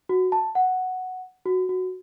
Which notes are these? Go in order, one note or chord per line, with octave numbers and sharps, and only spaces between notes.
F#4
A5
F#5
F#4
F#4